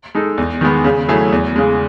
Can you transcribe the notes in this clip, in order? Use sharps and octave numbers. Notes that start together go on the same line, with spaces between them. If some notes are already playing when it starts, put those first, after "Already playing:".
G#3 D#4 A4
E2
D#3 G#3 B3
C#3
F#3 A3 E4 G#4
E2
C#3 G#3